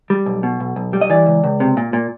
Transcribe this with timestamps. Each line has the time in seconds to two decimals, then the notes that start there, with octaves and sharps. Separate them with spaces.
0.10 G3
0.26 B1
0.43 B2
0.60 B1
0.76 B1
0.93 G3
1.01 D#5
1.10 E3 D5
1.26 C#2
1.44 C#2
1.60 C3
1.77 A#2
1.93 A#2